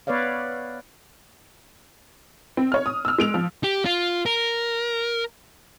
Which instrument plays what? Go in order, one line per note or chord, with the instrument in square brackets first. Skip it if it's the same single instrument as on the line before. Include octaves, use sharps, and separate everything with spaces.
[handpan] B3 B4 C#5 D5 F5
[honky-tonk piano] C4
C#5 F6
D#6
E6 F6
G#3 D7 F7
F3
[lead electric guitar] G4
F4
A#4